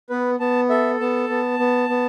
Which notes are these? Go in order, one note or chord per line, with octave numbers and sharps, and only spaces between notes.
B3 B4
B3 A5
A4 E5
B3 A5
B3
B3
B3